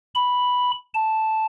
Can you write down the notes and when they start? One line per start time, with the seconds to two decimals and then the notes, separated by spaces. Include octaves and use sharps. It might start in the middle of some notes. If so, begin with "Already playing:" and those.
0.15 B5
0.94 A5